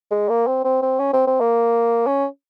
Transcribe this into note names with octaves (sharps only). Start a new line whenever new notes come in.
G#3
A#3
C4
C4
C4
C#4
C4
C4
A#3
C#4